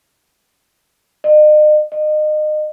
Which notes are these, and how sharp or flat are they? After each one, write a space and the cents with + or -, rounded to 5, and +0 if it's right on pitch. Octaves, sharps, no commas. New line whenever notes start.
D#5 -40
D#5 -30